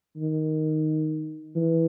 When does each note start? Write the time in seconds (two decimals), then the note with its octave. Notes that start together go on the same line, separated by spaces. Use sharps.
0.16 D#3
1.55 E3